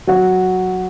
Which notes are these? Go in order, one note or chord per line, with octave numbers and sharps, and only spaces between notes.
F#3 F#4